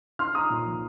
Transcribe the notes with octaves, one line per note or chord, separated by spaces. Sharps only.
D#4 C6 F6
D#4 A#5 D#6
A#2
F3